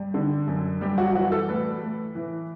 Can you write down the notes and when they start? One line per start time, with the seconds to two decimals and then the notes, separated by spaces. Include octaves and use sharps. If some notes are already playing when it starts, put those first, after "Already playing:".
Already playing: G2 G3
0.14 D3
0.48 F#2
0.81 G3 G4
0.98 F#4
1.15 E3 F#4
1.32 A4
1.49 A2 B4
1.82 A2
2.15 E3